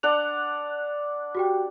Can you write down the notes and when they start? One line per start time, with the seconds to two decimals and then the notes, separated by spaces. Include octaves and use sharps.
0.03 D4 D5 F#5 F7
1.35 F#4 G4 G5